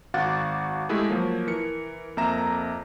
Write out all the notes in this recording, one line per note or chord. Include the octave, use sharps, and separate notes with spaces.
G#1 F#4 F5 F#5 D6 A6
G#3 A3 E4 G4 G#4
F3 F#3 A#3
E3 A#4 C#7
F2 A#3 E5 A#5 E7